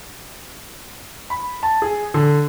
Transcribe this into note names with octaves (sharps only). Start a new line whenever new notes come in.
B5
A5
G#4
D3